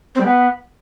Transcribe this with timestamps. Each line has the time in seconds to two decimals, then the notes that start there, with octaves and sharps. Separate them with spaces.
0.15 C4
0.20 G3
0.25 B3